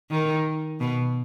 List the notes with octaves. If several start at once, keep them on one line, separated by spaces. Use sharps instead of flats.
D#3
B2